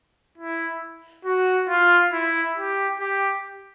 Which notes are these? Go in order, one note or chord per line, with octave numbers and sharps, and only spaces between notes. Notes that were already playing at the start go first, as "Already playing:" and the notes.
E4
F#4
F4
E4
G4
G4